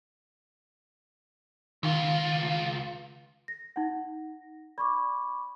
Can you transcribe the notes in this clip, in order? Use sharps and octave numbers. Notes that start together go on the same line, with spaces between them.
C#2 D#3 F4
A#6
D#4 F#5
D5 B5 C#6 D6